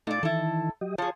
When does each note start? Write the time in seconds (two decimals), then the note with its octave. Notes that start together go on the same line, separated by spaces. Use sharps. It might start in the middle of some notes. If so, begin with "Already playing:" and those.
0.07 A#2 A3 D#4 D5
0.23 D#3 E3 E4 A4
0.81 F#3 G4 D#5
0.98 F3 F4 G#4 C#5